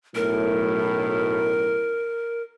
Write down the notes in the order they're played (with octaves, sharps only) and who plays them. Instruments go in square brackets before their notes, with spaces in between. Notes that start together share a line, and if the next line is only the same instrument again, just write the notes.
[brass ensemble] B1 F#2 A2 [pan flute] A#4